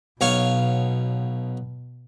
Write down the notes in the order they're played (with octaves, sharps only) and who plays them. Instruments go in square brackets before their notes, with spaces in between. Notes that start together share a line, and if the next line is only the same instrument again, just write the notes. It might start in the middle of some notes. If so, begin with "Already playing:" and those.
[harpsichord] B1 C#5 F5 [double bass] B2